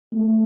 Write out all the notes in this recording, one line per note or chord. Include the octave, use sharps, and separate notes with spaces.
A3